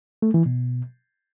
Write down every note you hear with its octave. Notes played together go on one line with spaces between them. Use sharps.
A3
E3
B2